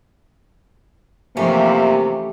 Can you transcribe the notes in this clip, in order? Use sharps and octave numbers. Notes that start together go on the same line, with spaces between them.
C3 E3 F3 A3 A#3 C#4 G4